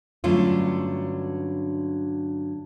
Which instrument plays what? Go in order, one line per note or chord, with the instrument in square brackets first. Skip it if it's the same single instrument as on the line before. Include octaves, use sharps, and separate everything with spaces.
[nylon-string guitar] G2 D3 F#3 A3 C#4 F4